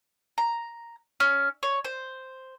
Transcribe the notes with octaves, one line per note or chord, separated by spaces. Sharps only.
A#5
C#4
C#5
C5